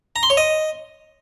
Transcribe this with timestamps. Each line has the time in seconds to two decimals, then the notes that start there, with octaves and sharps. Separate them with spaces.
0.16 A#5
0.23 C6
0.30 C#5
0.37 D#5